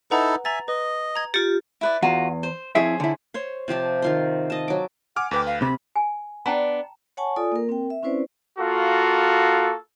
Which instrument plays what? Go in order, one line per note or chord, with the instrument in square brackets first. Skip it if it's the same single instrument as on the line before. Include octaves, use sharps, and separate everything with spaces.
[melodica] D#4 E4 A4 [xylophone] B4 F#5 A#5
[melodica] E5 G#5 [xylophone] A#5 A6
[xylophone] B4 [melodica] D#5
[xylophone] A#5 G#6
[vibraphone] F4 G4 [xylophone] A6 C#7 D7
[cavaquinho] E4 B4 D5
[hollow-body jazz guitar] E2 [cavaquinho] F4 F#4 A#5
[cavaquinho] C5
[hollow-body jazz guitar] F2 E4 E5 [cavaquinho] G#4 C5 C#5
[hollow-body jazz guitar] D3 E4
[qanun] C5 C#5 C6
C3 F3 G4 A5
D#3 F4 C6
D#5 A5
F#3 D6
[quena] F#5 [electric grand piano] G#5 D6 F6
[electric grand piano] D2 B4 G5 [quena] D6
[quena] F5
[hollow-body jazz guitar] C3 [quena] B5
[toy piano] G#5
[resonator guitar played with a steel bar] B3 D4 [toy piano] G5 A5 A#5
[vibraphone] C#5 F#5 G#5 A5 C#6
F4 A4 D5 G#5 D#6
A#3 A#4
C4 A#4 G5
E5
C4 C#4 E4 B4 C5 D5
[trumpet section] A#3 F4 F#4 A4